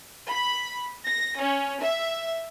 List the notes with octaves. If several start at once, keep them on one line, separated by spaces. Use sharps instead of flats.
B5
A#6
C#4
E5